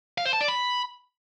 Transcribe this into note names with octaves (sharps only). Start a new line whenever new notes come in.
F5
C5
A5
D5
B5